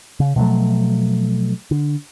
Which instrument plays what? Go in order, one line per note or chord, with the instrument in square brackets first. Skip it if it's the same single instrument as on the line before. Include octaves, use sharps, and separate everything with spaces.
[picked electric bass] C#3
B2 F3 F#3 A3
D3